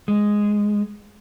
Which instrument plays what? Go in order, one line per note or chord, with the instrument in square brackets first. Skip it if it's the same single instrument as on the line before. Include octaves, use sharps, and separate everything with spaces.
[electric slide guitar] G#3